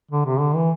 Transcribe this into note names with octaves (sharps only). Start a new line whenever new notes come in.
D3
C3
D3
E3